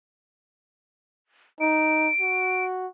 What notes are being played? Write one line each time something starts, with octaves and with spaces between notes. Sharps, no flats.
D#4 D7
F#4